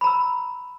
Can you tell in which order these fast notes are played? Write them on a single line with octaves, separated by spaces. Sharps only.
B5 A#5 E6